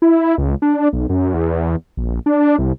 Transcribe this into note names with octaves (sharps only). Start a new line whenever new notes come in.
E4
C#2
D4
B1
F#2
E2
A#1
D4
C2